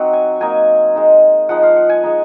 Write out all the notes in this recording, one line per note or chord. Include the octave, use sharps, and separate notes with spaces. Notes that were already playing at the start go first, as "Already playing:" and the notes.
Already playing: F#3 C4 D#4 F#5
G#5
F#3 A#3 D#4 G#5
G#3 D#4
F3 G#3 D#4 F#5
F5
F#5
G#5
G#3 D#4